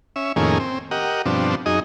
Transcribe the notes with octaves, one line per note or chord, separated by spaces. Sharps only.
C#4 E5
F2 A2 D#3 A#3 C#4 G#4
C4
G4 A#4 D#5 F#5
G2 B2 F3 C4 D4
F#2 D#4 G#4 D#5